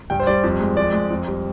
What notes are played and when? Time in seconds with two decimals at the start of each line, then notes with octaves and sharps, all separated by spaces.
0.10 G2 G5
0.20 C5
0.27 G3 D5
0.44 F2
0.60 G#3
0.77 F2 D5
0.94 G#3
1.10 F2
1.28 G3